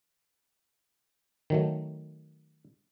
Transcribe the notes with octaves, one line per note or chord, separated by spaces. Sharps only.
D#3 F#3 A3